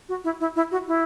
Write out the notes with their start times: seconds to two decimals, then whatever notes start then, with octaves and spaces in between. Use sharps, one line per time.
0.09 F#4
0.24 E4
0.40 E4
0.56 E4
0.72 F#4
0.88 E4